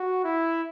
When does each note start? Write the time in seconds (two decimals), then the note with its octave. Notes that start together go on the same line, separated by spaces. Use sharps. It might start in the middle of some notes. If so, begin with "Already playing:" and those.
Already playing: F#4
0.24 E4